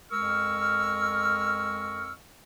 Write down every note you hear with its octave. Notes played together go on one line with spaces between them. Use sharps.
F2 G#3 A#4 C#6 E6 F6